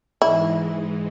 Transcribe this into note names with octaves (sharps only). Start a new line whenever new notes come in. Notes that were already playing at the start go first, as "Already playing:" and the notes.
G#2 E3 G#3 E4